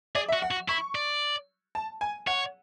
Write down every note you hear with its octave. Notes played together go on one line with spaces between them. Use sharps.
G#4 D5
E5
F#4
F#5
F#4
E4 C#6
D5
A5
G#5
C#5 F#5